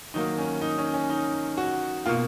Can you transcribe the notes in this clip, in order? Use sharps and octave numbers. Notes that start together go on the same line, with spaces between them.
D#3 F#3 A#3 D#4
C#4
D#4
C#4
C#4
D#4
F#4
B2 A#3 F4